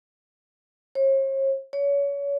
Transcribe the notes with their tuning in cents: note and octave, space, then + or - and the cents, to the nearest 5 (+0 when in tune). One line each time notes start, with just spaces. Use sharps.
C#5 -45
C#5 +30